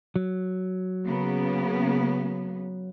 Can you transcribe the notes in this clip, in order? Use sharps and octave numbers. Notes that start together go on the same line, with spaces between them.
F#3
C#3 A#3 B3